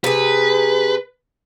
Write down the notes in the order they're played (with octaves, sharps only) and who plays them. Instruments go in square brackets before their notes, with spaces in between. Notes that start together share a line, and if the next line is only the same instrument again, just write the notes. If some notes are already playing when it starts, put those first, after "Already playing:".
[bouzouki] C3 G#4 [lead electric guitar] B4